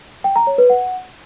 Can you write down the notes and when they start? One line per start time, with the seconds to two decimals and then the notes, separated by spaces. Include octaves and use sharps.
0.24 G5
0.36 A#5
0.47 C#5
0.58 B4
0.70 F#5